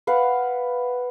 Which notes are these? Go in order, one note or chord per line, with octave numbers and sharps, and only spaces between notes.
B4 F5 F#5